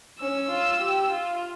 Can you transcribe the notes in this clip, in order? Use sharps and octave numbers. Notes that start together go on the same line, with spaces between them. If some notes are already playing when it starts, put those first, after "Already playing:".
C#4 E6
F4
G4
F4